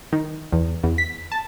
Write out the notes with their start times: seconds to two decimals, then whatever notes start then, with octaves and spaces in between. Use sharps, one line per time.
0.13 D#3
0.52 E2
0.84 E2
0.98 B6
1.32 A5